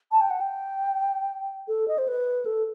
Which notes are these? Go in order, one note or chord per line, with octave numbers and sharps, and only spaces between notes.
A5
G5
F#5
G5
A4
D#5
C5
B4
A4